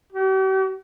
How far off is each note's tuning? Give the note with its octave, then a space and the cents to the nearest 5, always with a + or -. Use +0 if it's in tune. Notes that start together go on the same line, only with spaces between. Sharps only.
G4 -45